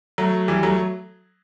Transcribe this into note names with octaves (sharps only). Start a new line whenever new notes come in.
F#3 A3
E3 G3
F#3 A3